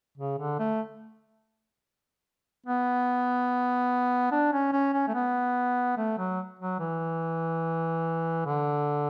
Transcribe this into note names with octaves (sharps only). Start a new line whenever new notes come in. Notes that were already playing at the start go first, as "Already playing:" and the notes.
C#3
D3
A3
B3
D4
C#4
C#4
C#4
A3
B3
A3
F#3
F#3
E3
D3